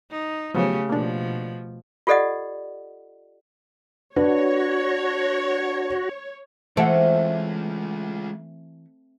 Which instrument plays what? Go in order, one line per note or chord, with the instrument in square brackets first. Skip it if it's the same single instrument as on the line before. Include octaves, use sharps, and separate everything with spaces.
[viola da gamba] D#4
[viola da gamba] C#3 A3 G4 [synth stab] F3 F#3 B3
[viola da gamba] B2 F3 [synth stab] A#3 D4
[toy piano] F4 G4 A4 D5 D#5 F#5
[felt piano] D4 B4 [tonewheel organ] F#4 [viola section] C#5
[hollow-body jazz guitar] E3 F#5 [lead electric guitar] G#3 F4 [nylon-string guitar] A3 [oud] C4